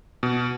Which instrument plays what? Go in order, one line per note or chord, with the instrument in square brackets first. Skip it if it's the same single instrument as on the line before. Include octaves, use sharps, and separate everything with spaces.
[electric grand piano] B2